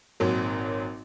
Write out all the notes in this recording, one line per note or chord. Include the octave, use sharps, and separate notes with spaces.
G#1 A#2 F#3